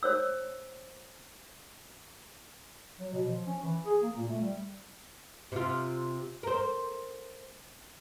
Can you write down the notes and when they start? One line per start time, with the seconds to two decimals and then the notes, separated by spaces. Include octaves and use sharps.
0.03 C5 C#5 E6
3.00 F#3
3.13 B2
3.28 F3
3.47 C#4
3.63 E3
3.86 G#4
4.02 A#3
4.17 A#2
4.29 A3
4.42 G3
5.52 C3 F4
6.43 A#4 C5